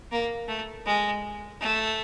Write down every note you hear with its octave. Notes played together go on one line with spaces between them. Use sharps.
A#3
A3
G#3
A3